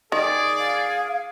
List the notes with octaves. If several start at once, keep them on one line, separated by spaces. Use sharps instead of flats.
D#3 G#4 D5
F5